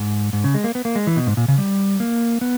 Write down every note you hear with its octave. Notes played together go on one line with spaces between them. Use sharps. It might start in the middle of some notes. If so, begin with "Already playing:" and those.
Already playing: G#2
G#2
C#3
G#3
A#3
B3
A#3
G#3
E3
B2
G#2
A#2
C#3
G3
A#3
B3